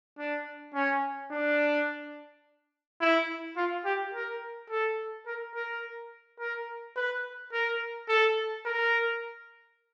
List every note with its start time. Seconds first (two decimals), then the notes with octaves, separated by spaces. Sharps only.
0.18 D4
0.74 C#4
1.32 D4
3.01 E4
3.57 F4
3.85 G4
4.14 A#4
4.70 A4
5.26 A#4
5.55 A#4
6.40 A#4
6.96 B4
7.53 A#4
8.09 A4
8.65 A#4